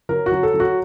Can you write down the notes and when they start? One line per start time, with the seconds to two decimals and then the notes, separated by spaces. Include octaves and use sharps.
0.09 F#3 A#4
0.26 F#4
0.32 F#3
0.43 A4
0.54 F#3
0.60 F#4